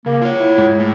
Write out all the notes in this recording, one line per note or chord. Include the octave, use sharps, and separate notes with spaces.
C#3 A#3
F4 C#5
E4
G#2
A2